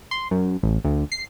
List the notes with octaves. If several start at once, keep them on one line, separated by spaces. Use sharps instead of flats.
C6
F#2
A1
D2
C7